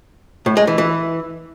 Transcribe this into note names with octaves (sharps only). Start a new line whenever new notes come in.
A2
G#3
E3
E3